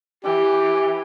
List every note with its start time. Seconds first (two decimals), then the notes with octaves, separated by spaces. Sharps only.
0.24 E3 G4